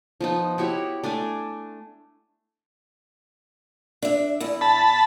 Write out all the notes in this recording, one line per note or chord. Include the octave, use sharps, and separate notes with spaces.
F3 B3 D#4
E4 F#4 G4 C#5
A3 D4 G#5 D6
D4 E5
E2 E4
A5 B5